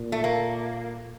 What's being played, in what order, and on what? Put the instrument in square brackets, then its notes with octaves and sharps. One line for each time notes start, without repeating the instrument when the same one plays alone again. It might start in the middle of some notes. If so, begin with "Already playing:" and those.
Already playing: [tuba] A#2
[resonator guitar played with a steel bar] A3
A#3